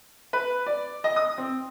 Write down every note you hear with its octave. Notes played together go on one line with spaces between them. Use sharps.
B4
D5
D#5
D#6
C4